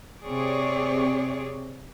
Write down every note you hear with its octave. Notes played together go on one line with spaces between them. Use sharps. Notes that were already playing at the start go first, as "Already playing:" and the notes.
C3 C4 G#4 C#5 D5